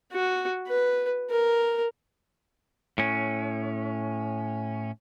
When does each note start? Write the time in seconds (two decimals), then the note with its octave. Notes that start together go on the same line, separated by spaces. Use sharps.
0.13 F#4
0.68 B4
1.31 A#4
2.98 A2 C#4